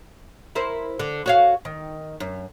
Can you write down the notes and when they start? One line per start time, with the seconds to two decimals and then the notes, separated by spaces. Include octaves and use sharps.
0.55 E4 A#4 C5
0.99 D3
1.26 F#4 C#5 F5
1.65 D#3
2.20 F#2